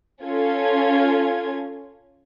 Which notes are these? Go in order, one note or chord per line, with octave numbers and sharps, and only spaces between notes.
C#4 F4 A4 G#6